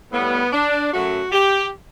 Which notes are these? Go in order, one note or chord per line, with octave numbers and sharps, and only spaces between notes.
A2 G3 B3
D4
F#2 F#3 A3 F#4
G4